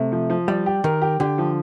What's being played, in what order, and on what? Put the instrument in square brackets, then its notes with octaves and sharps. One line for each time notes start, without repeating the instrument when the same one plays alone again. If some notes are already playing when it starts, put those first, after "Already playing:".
Already playing: [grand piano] C3 [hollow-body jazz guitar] A3
[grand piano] F3
F3
[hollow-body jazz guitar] G3 [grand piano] D5
[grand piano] G4
[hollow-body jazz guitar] D#3 [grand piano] A#4
[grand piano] G4
[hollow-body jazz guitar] D3 [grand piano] G4
[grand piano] F3